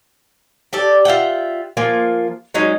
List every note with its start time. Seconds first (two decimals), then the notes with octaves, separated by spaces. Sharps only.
0.73 G4 A4 D5
1.05 F4 E5 F#5 G5
1.77 F3 A#3 F4 G#5
2.54 F#3 G#3 C#4 D#4